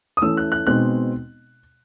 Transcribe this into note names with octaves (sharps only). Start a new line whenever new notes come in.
D#6
E3 A3 C#4 E6
F#6
F#6
B2 G#3 C4 D#4 F#6